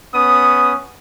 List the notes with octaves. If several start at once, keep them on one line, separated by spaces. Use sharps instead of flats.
B3 C#4 D#6